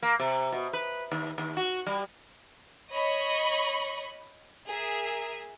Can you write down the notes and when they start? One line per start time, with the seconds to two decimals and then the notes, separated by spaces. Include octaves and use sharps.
0.02 A#3
0.20 C3
0.52 B2
0.73 B4
1.12 D#2
1.38 D#2
1.57 F#4
1.86 G3
2.91 C#5 D#5 B5 C#6
4.67 G#4 A#4 E5